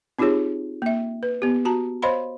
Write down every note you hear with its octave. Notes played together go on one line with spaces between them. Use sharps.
C4 D#4 F4 G4 G#4 C#5
A#3 E5
B4
B3 G4
F#4 A5 A#5
C5 C#5 D#5 F5 B5 C6